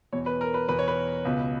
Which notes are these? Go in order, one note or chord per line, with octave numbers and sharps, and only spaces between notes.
E2 B2 C#5
B4
A#4
B4
E2 B2 B4
C#5
B4
C#2 B2